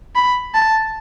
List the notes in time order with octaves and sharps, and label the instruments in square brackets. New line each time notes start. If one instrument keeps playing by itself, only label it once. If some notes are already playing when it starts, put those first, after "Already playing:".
[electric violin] B5
A5